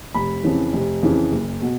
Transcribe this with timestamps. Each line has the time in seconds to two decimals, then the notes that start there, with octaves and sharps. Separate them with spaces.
0.14 F1 B5
0.43 F2 C#3 E3
0.73 F1
1.03 F2 C#3 E3
1.32 F#1
1.61 B2